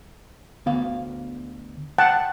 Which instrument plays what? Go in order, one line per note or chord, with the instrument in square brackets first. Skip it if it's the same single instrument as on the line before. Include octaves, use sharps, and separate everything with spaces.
[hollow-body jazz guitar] D2 B3 F5
[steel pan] F#5 G5 A5